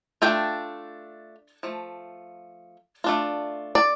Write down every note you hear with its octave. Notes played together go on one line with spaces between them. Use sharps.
A3 D4 F4 G5
F3 A3
A3 D4 F4
D5